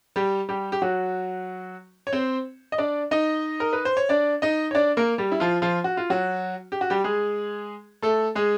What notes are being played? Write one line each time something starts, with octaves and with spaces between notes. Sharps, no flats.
G3 G4
G3 G4
G4
F#3 F#4
C#5
C4 C5
D#5
D4 D5
D#4 D#5
A#4
B4
C5
C#5
D4 D5
D#4 D#5
C#5
D4 D5
A#3 A#4
G3 G4
E4
F3 F4
F3 F4
F#4
F4
F#3 F#4
G4
F#4
G3 G4
G#3 G#4
A3 A4
G#3 G#4